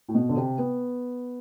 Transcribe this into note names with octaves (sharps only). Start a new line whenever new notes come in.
A2
B2
D3
C3
B3